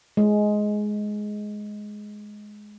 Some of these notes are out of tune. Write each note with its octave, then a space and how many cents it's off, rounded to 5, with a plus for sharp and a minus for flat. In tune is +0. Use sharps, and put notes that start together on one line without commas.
G#3 +10